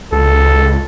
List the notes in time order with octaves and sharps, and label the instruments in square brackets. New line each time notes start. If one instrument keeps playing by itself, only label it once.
[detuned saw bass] C#2 [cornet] A4